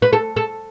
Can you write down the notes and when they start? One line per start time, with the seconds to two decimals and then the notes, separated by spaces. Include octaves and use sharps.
0.02 B4
0.13 A4
0.36 A4